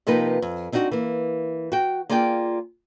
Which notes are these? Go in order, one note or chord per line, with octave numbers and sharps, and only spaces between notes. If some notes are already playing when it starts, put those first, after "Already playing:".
C3 F3 A#3 D#4 B4
F2
C4 D4 D#4 F4 F#4
E3 A#3
F#4 G5
A#3 F4 G#4 D5 G5